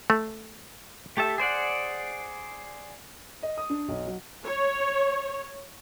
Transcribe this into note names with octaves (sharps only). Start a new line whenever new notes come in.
A3
A3 G4 A4 E5
G#4 C5 D5 F#5
D#5
D#6
D4
B1
F#3
C#5